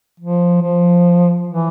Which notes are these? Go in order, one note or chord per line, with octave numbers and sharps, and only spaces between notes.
F3
F3
E3